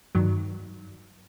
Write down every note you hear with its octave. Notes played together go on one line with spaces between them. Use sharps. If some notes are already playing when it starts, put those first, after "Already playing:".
G2 D#3 F#3